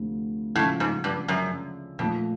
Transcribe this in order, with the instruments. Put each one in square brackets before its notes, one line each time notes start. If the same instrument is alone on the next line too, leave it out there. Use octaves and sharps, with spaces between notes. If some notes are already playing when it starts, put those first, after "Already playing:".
Already playing: [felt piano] D2 C3 F3 A3
[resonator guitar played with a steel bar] A2 [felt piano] C#3 F3 G#3 C#4
[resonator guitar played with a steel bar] G#2
G2
F#2
[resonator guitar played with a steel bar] F2 [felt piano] A#2 F3 A3